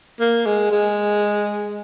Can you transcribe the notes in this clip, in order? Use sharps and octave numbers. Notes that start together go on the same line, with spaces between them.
A#3
G#3
G#3